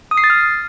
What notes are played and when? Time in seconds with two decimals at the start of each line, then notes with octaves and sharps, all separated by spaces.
0.11 D#6
0.17 C7
0.24 A6
0.30 F6